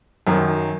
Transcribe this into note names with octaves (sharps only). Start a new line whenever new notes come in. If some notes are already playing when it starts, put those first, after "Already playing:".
F#2 D#3 F#3